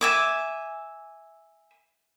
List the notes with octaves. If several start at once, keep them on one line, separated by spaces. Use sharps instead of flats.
E5 G#5 D6